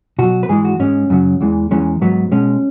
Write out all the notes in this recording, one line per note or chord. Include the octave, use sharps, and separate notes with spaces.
B2 F#3 F#4
B4
G#2 E3 G#3 G#4
F#4
G#2 G#3 C#4
F#2 C#3 F#3
E2 E3 G#3
E2 E3 G#3 C#4
G#2 F#3 B3
B2 G#3 C#4